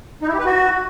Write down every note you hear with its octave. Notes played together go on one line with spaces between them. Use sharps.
D#4
E4
G4
B4
F#4